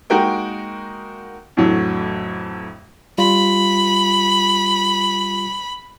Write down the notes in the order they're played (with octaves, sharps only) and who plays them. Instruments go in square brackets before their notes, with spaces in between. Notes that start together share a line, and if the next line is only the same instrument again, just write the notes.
[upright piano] G#3 A#3 D#4 F#4 A#4 G5
F2 A2 D3 E3 F#3
[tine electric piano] G3 F4 [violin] B5